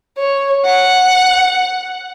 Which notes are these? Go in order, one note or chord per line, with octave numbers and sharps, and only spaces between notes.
C#5
F#5